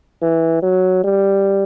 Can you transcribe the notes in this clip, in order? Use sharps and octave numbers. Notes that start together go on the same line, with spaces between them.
E3
F#3
G3